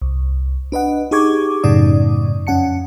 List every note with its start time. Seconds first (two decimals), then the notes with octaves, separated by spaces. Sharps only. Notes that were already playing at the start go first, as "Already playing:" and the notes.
0.02 C2
0.72 D4 B4 D#5 F#5
1.11 D#4 G4 G#4 C#6 D6 G#6
1.63 F#2 A2 C#3 D#4 D5 D#6
2.47 F2 C#4 F#5 A5 C#7